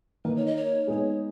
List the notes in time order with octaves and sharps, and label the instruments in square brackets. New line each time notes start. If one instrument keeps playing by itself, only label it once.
[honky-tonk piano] D#3 A#3 D#4 [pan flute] B4
[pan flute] C#5
D#5
C#5
[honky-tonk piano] G#3 B3 D#4 G#4